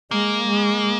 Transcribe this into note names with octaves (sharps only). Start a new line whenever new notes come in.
G#3 A#3
G#3